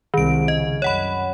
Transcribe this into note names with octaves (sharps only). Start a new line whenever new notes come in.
C2 D#3 G#3 D7
C#3 D#5
F#2 C#5 F#5 B5